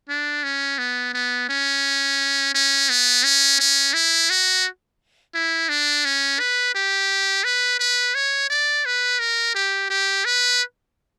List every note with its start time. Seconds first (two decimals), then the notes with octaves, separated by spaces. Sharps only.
0.09 D4
0.44 C#4
0.78 B3
1.13 B3
1.49 C#4
2.54 C#4
2.89 B3
3.24 C#4
3.60 C#4
3.94 E4
4.30 F#4
5.35 E4
5.69 D4
6.05 C#4
6.40 B4
6.75 G4
7.44 B4
7.79 B4
8.15 C#5
8.50 D5
8.85 B4
9.19 A#4
9.55 G4
9.90 G4
10.25 B4